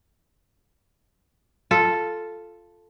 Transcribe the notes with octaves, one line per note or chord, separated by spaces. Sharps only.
F4 A4